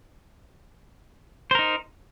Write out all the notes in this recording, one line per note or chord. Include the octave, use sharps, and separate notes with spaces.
D#4 A#4 C5